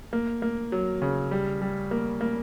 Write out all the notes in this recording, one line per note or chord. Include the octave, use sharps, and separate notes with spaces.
A#3
A#3
F#3
C#3
G3
G3
A#3
A#3